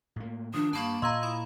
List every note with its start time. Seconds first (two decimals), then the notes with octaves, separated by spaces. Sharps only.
0.16 A2 A#3
0.54 D#3 F3 D4 D#6
0.73 G2 A#3 A5 B5 C#6
1.02 A#2 D#5 F5 A#5 C6 E6 G#6
1.23 E4 B5 D#6